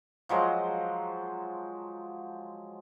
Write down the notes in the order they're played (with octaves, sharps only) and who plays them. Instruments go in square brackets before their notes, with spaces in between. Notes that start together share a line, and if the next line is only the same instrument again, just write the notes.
[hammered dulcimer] F3 F#3 G#3 C5